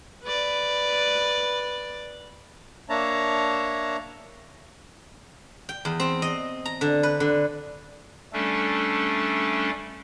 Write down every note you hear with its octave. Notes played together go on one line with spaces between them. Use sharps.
B4 D5
A#3 D4 C#5 E5 A5 A#5
G5
E2
C4
D#5
A#5
D3
B4
D3
G3 A3 C#4 D4 A4